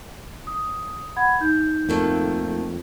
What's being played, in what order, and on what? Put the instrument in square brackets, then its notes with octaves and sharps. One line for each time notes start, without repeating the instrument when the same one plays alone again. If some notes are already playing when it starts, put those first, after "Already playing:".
[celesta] D#6
F#5 B5 G#6
D#4 G6
[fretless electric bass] F2 [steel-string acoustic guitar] D#3 A3 A#3